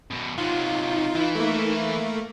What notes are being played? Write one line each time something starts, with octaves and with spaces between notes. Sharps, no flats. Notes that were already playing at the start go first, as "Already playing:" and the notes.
F#2 B2
C3 F#3 D#4 F4
E3 E4
A3 A#3